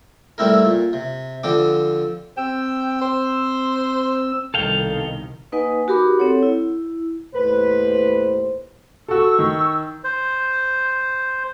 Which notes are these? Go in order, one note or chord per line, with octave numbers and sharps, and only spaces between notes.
G3 A3 C4 E4 A#4
A#2
C3
D3 F3 C4 D6
C4 G5 E6
C5
C2 B2 D#3 A4 F5 G5
A#3 D#4 B4 D#5 F#5 G#5
D#4 F#4 G4 A#4 B5 D6
C4 A4 C#5 F#5
E4
D#2 A2 B4 C5
F#4 A4 C#6 E6
D#3
C5